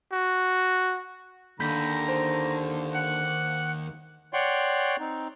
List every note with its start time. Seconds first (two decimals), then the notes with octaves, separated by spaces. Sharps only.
0.12 F#4
1.60 D#2 D3 A#5 B5 G6 B6
2.08 C5
2.95 F#5
4.33 C#5 D5 F#5 G5 C6 C#6
5.00 C4 D#4